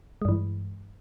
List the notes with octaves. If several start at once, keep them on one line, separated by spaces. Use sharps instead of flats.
G2 E3 G#3